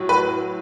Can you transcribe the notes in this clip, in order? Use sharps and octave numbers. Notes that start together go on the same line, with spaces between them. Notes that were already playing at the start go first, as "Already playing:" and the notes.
Already playing: A2 F#3
B4